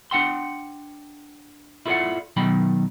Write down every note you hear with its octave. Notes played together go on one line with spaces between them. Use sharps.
D4 F#5 G5 C6
E4 F4 A4 A#4 D5 F#5
B2 D#3 F#3 G5 B5